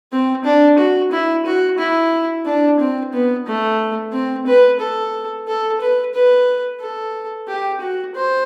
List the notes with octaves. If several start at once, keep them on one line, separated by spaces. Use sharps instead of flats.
C4
D4
F#4
E4
F#4
E4
D4
C4
B3
A3
C4
B4
A4
A4
B4
B4
A4
G4
F#4
C5